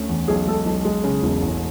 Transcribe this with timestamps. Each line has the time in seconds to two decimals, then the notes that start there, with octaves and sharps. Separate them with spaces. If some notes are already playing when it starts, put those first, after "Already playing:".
Already playing: D2 A3 C#4
0.09 E2
0.28 B1 G#4
0.47 G#3 A4
0.66 B1
0.85 G#3
1.04 C#3
1.23 E1
1.42 A1